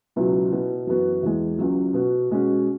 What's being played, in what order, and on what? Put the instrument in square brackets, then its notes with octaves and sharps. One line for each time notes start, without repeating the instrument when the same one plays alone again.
[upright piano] C#2 B2 F#3 B3 E4
B2 B3 E4
F#2 E3 B3 F#4
E2 E3 G#3
C#2 C#3 F#3
B2 B3 F#4
B2 G#3 C#4 F#4